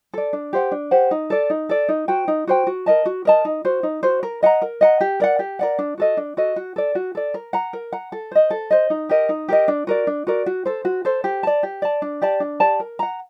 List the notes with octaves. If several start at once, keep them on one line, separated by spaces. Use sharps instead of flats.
A4 D5
D4
G4 C5 F#5
D4
G4 C5 F#5
D#4
A4 D5
D#4
A4 D5
D#4
F#4 C5 G5
D#4
F#4 C5 G5
F#4
A#4 D#5 A5
F#4
A#4 D#5 A5
D#4
F#4 C5
D#4
F#4 C5
A#4
D#5 F#5 A#5
A#4
D#5 F#5 A#5
G4
A#4 D5 F#5
G4
A#4 D5 F#5
D4
F#4 A4 D#5
D4
F#4 A4 D#5
F#4
A4 D5
F#4
A4 D5
A#4
F#5 A#5
A#4
F#5 A#5
A4
C5 D#5
A4
C5 D#5
D#4
G4 A#4 D#5
D#4
G4 A#4 D#5
D4
F#4 A#4 D5
D4
F#4 A#4 D5
F#4
A4 C5
F#4
A4 C5
G4
D5 A5
G4
D5 A5
D4
G4 D5 A5
D4
G4 D5 A5
A#4
F#5 A#5